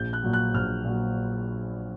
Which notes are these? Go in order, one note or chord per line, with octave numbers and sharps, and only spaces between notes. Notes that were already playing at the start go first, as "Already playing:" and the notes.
Already playing: A#1 G6
F#6
A#2 F#3
F#6
A#1 F6
A#2 F#3